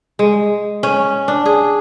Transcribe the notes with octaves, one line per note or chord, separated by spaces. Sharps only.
G#3
C#4
D4
G#4